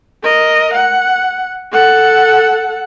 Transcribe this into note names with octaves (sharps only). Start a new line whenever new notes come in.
A#4 D#5
F#5
A4 F#5